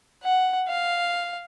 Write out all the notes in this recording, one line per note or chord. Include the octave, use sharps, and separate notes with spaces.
F#5
F5